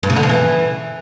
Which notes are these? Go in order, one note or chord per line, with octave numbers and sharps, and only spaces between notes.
G2
C#3
D3
F3
E3